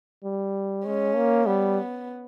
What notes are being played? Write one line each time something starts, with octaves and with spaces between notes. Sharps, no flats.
G3
G#3 C#4
A#3
G3 B3